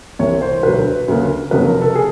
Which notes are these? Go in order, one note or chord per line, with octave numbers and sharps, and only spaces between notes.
C2 C3 E3 C#5
C5
E1 D2 D3 F#3 B4
D2 C#3 F#3 A#3
F1 F2 C#3 F#3 A#3 B4
A#4
A4
G#4